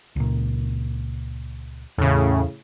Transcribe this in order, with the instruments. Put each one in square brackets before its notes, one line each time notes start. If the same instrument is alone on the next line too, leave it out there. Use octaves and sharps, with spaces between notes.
[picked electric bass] C#2 A#2
[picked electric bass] E2 [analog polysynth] A2 C#3